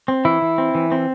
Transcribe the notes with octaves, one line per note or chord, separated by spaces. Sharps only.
C4
E3 E4
E3
C4
E3
C4